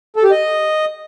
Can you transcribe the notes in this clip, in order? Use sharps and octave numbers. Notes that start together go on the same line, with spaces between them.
A4
G4
D#5